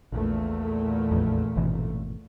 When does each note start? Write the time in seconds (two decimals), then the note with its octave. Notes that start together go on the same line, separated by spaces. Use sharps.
0.12 A#1 E2 A#2 A3
1.11 A#1 F2
1.56 G#1 B2 E3